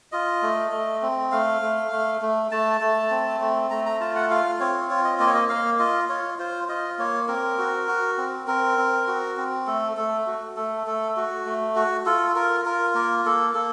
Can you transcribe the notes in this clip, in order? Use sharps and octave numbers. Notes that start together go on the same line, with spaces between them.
F4 D#5
A3
A3
C4
A3 F5
A3
A3
A3
A3 A5
A3
C4
A3
A3 A#5
A#5
F4 A5
F#5
F4 F5
C4 C#5
F4 C#5
D#5
A#3 D#5
C#5
D#5
A#3 F5
F4 D#5
F4 C#5
F4 C5
F4 D#5
A#3 C#5
C4 A#4
F#4
F#4
C4
C4 A#4
C4
F#4
C4
A3 A4
A3 A4
F#4
A3 A4
A3 A4
F#4
A3
F#4
F4 A4
F4 A#4
F4 A#4
A#3 A#4
A#3 A4
A#3 A4